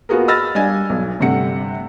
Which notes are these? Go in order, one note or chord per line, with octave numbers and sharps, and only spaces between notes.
A#3 B3 F4 F#4 G#4 A#4
D#5 B5 E6 F6 A6 A#6
G3 D4 D#5 F5 G#5 G#6
B1
G1 G2 C3 A3 F#5 C#7